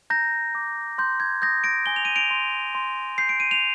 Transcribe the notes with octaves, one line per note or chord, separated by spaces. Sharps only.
A#5 G6 A#6
D6
C6 G6
G#6
D#6 G6 A#6
A#6 D7
G#5 G7
F7
D#7
D7 F7
C6
C6
G6 C7
D7
D#7
F7